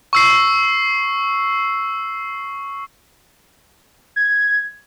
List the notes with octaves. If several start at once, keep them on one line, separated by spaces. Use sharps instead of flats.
C#6 E6 C7
G#6